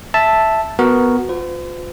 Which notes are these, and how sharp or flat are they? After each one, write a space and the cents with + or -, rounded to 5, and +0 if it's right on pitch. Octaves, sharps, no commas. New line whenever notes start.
E5 +0 A5 +0
B3 +0 F#4 +0 A#4 +0
F4 +25 C5 -45